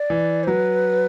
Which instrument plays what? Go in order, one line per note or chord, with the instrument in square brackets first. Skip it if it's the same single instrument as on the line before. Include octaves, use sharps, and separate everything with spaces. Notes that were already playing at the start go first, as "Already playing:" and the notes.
Already playing: [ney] D5
[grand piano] E3
[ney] C5
[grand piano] F#3 [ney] B4